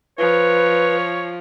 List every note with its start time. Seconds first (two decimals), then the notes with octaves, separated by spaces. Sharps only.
0.18 F3 B4 C#5